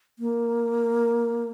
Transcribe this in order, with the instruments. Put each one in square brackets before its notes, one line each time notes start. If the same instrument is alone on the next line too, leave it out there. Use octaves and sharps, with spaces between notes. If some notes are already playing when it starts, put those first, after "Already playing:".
[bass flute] A#3